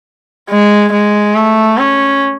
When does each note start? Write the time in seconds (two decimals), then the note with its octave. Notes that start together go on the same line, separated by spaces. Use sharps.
0.50 G#3
0.92 G#3
1.35 A3
1.78 C#4